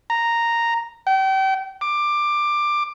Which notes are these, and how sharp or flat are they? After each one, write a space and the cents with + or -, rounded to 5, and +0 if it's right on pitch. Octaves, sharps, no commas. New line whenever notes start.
A#5 -5
G5 -35
D6 +15